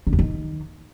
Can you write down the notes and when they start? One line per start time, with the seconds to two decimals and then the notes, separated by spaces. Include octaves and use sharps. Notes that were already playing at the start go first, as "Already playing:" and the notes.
0.07 D3
0.13 E2
0.19 D#3